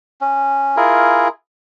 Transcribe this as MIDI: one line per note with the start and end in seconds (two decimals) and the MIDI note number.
0.21 0.76 61
0.77 1.28 64
0.77 1.28 65
0.77 1.28 68
0.77 1.28 70